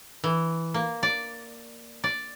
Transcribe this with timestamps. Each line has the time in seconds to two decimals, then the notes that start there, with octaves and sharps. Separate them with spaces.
0.24 E3
0.74 A#3
1.03 D5
2.04 D5